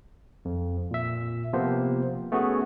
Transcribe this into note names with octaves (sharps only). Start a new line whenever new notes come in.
F2
A#2 E5
C3 F3 A#3 B3 C5
A3 B3 C#4 F#4 G#4